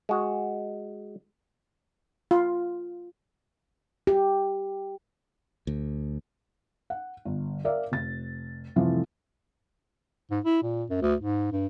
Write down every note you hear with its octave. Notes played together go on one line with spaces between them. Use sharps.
G#3 F#4
F4
G4
D2
F#5
G1
A#4 D5 E5 F5
F1 A6
C2 F2 C3 E3 F3 A3
G#2
E4
A#2
F#2
D2
G#2
G2